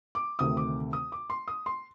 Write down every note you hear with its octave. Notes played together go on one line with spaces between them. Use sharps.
D6
D2 C3 D#3 A3 D#6
D6
D#6
D6
C6
D#6
C6